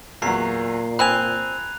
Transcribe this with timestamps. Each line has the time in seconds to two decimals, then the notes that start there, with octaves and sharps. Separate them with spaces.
0.22 E2 A#2 F#3 A#5 C7
0.99 F3 C4 G#5 B5 F#6 F7